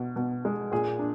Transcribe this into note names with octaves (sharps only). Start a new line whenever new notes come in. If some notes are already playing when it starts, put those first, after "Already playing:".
Already playing: B2
B2
G#3
A#2 G#4
D4